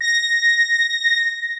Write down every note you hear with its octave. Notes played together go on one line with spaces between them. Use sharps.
A#6